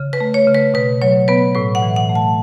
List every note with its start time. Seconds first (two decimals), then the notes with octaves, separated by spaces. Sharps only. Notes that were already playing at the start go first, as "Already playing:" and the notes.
Already playing: C#3
0.13 B4
0.20 A3
0.34 C#5
0.47 C#3
0.55 B4
0.74 B2 B4
1.01 F#3 C#5
1.28 B3 B4
1.55 A2 B4
1.75 F#5
1.82 E3
1.96 F#5
2.09 A3
2.15 A5